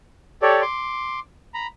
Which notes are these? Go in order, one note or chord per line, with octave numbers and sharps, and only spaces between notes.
G4 A4 C#5 D5
C6 D6
A#5 B5